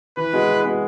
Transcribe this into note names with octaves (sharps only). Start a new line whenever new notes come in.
E3 B4
G#3 B3 F#4
E3
G#3 B3 F#4